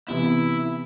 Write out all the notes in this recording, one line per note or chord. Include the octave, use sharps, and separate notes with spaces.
C3 E3 B3 E4